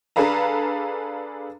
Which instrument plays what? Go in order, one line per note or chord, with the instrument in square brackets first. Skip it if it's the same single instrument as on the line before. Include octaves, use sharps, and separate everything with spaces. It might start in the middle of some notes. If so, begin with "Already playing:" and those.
[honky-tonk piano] D4 G#4 A4 B4 F5 A#5